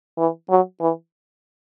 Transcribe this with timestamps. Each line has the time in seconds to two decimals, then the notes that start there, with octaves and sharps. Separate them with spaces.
0.18 E3
0.50 F#3
0.81 E3